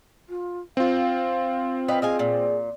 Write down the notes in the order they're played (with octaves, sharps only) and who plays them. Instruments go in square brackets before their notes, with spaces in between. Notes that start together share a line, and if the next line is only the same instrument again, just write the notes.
[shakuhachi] F4
[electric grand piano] C4 F4 [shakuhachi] F5
[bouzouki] B4 D#5 F5 [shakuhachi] G5
[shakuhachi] G#4 [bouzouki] D#5 F5 G#5
[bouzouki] A#2